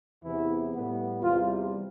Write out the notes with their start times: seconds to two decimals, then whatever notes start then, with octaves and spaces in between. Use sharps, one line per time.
0.24 E2 C3 E3 B3 E4
0.74 A2 G3 B3
1.22 E2 C3 G3 F4